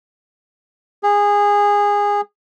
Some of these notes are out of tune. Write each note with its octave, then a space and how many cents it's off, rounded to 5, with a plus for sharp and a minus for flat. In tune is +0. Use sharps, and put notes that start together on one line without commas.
G#4 -20